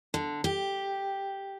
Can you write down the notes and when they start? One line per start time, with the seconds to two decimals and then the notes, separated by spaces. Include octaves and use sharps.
0.14 D3
0.44 G4